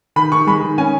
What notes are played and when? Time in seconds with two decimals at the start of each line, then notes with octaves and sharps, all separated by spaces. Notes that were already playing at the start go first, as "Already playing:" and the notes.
0.16 D#3 B5
0.32 D#3 C#6
0.47 G#3 B5
0.62 D#3
0.78 C#4 G#5